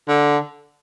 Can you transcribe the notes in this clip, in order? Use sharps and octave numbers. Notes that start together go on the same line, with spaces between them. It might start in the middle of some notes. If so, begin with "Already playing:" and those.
D3